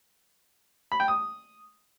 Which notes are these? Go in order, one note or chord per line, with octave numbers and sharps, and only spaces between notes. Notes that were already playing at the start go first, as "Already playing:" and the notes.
B5
G5
D#6